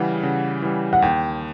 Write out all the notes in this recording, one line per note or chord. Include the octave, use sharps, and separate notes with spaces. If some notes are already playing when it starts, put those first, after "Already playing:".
Already playing: C#3 E3 G3 F#5
C#3
E3 G3
F#5
D#2 G5